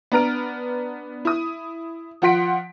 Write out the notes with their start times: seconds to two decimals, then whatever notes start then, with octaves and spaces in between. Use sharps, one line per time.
0.12 B3 D4 A#5 F6 D7
1.25 E4 D#6
2.22 F3 F4 F#5 C6 B6 D7